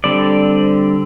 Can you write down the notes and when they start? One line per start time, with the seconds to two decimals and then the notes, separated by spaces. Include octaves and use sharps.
0.04 D3 G3 C4 D5